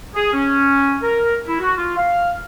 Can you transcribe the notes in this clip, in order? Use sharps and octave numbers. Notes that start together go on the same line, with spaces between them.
G#4
C#4
A#4
E4
F#4
F4
F5